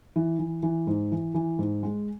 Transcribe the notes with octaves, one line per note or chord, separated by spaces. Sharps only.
E3
E3
E3
G#2
E3
E3
G#2
G#3